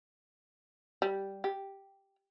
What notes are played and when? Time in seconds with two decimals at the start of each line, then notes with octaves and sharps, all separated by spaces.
1.02 G3
1.44 G4